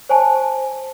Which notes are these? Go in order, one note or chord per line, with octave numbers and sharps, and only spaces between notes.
C5 G#5 A5